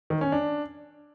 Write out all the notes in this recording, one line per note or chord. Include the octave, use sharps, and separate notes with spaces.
D#3
C#4
D4